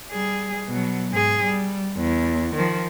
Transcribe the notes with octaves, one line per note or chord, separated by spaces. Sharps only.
G3 G#4
B2 F#3
G#2 G#4
G3
E2
D#3 F3